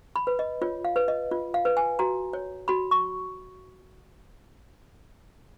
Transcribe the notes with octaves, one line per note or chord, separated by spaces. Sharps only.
B5
B4
D#5
F4 C#5
F5
B4
D#5
F4
F5
B4
G#5
F#4 A#5
C#5
F#4 B5
C#6